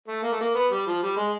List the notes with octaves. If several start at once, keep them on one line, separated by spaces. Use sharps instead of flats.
A3
A#3
A3
A#3
B3
G3
F3
G3
G#3